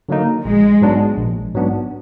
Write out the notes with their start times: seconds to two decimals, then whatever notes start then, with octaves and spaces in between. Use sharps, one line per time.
0.09 D3 F#3 A#3 D#4
0.45 A#1 G#3
0.81 G#2 F#3 B3 D4
1.18 A#1
1.54 G#2 F#3 B3 D4